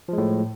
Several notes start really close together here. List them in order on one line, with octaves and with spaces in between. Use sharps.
F3 G#3 A2